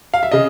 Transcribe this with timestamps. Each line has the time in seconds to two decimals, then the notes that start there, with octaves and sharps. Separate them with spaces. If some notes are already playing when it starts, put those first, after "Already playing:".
0.14 F5
0.23 E5
0.31 C#3 D#5